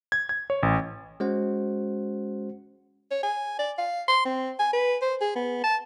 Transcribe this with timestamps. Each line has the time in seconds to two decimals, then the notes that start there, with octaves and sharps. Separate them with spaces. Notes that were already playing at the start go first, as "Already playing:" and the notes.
0.12 G#6
0.29 G#6
0.50 C#5
0.63 A1
1.20 G#3 C#4 F#4 C5 F#5
3.11 C#5
3.23 G#5
3.59 D5
3.78 F5
4.08 C6
4.25 C4
4.59 G#5
4.73 B4
5.02 C5
5.21 G#4
5.36 B3
5.64 A5